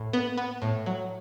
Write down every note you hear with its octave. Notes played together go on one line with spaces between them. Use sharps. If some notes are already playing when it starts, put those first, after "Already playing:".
Already playing: A2
B3
B3
A2
F#3